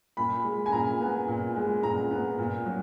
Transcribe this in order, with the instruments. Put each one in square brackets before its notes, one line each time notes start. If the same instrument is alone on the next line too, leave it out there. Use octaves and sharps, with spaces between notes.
[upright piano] A#2 B5
G#3
G#5
A#2 A#5
B3
A#2
G#3
A#2 A#5
B3
A#2
F#3